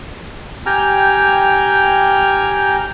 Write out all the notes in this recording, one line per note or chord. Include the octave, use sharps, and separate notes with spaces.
G4 G5 G#5 A#5 F6